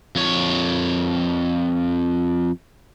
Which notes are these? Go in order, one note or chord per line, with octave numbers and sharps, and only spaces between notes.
F2 C#5